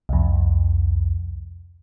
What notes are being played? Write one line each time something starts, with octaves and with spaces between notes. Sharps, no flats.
C2 F2